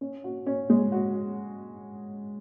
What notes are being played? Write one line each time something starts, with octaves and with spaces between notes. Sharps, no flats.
C#4
F#4
C#4
G#3
F#4